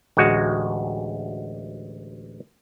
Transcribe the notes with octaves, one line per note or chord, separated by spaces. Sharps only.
A1 D2 G#3 F#4